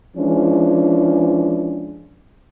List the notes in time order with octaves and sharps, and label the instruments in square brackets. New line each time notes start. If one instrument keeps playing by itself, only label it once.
[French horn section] E3 F3 G#3 C#4 D4